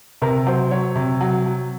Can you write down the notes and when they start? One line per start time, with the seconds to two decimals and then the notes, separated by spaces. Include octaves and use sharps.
0.22 C3 A#4
0.47 F#3 C5
0.71 F#3 C#5
0.95 C3
1.21 F#3
1.46 F#3